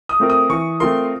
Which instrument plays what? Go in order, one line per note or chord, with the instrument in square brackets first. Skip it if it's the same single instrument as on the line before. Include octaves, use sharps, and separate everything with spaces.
[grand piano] D#6
[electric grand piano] A3 C4 F4 A#4
[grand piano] D#6
[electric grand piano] E3 [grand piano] C#6
[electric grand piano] A3 C4 F4 A#4 [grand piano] C6